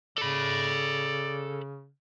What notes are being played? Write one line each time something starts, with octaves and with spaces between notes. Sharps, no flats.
C#3 A4 D5 B5